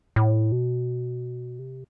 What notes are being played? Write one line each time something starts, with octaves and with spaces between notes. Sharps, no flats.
A2
B2
C3